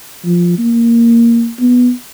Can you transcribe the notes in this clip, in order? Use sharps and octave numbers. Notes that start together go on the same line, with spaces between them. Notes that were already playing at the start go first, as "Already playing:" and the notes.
F3
A#3
B3